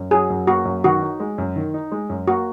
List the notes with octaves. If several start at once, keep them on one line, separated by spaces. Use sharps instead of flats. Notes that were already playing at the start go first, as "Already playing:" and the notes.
Already playing: F#2
F#3 G#4
F#2
A#3 F#4
F#2
D#3 F#4
D#4
G#3
F#2
D#3
D#4
G#3
F#2
A#3 F#4